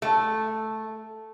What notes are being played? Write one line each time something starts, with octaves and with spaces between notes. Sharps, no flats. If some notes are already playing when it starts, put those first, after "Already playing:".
A3